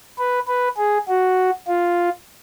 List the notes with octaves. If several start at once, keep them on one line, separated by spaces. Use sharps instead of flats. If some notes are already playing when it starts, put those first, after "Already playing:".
B4
B4
G#4
F#4
F4